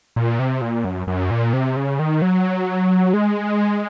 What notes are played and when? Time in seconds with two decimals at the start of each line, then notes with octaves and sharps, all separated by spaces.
0.16 A#2
0.39 C3
0.62 A#2
0.85 F#2
1.07 F#2
1.31 A#2
1.53 C3
1.76 C#3
1.99 D#3
2.22 F#3
3.13 G#3